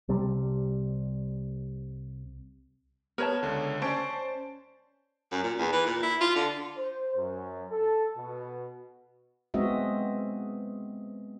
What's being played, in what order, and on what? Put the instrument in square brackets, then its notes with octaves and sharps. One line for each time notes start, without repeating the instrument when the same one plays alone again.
[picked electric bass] C2 C3 G3
[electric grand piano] B3 [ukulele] A#4 C#5 A5
[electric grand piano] C#2 D3
[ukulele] C#4 D5 [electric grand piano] C5 A5 D7
[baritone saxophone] F#2
A#2
E2
E3
A#2
E4
F4
D3
[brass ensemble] C5
F#2
A4
B2
[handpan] G#3 B3 C4 F#4 D#5 E5